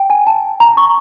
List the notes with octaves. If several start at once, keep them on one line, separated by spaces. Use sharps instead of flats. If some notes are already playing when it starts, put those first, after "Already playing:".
Already playing: G5
G#5
A5
A#5
C#6